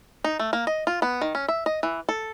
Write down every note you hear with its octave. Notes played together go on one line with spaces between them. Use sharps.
D#4
A3
A#3
D#5
F4
B3
D#3
C#4
E5
D#5
E3
A4